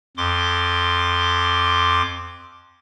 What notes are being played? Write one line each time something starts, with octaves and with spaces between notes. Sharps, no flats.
F2 C6 D6